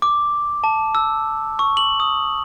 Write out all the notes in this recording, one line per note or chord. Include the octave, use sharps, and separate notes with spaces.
D6
A5
E6
C#6
F#7
D#6